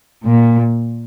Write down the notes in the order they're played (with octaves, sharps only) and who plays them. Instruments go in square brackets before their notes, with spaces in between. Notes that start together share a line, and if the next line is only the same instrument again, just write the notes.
[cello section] A#2